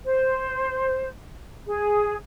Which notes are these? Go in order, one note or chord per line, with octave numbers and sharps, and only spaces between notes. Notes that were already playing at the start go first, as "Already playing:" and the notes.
C5
G#4